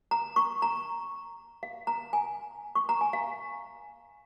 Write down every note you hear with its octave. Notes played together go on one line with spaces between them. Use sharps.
A#5
C#6
A#5
F5
A#5
G#5
C#6
A#5
G#5
F5